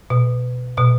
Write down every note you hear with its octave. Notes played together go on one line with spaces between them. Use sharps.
B2
B2